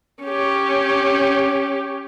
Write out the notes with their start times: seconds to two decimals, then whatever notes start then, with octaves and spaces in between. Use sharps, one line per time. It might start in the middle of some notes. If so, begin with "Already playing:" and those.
0.23 C#4 G4